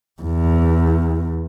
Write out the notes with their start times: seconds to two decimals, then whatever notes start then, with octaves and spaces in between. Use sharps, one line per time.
0.22 E2